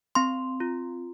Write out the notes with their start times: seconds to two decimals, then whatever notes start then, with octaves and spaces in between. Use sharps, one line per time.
0.15 C4 C6
0.60 F4